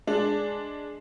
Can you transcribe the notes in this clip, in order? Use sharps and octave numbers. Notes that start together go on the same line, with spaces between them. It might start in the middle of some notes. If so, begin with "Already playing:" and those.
G#3 D4